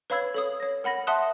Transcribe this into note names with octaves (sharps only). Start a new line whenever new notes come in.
B4 C#5 F5 B5 E6 G#6
A4 C#5 D#6
C#5 A#6
A#4 F#5 B5 A#6
E5 F#5 A5 C6 D#6 F#6